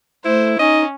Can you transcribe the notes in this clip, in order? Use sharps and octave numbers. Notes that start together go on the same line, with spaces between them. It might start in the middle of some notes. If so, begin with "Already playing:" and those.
A3 E4 C5
C#4 D#4 D#5